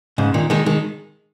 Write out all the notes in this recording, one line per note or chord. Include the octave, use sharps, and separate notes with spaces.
G#2 C#3
A#2 D#3
D#3 G#3
D#3 G#3